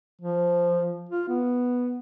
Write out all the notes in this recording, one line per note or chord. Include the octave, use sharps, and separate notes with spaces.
F3
F4
B3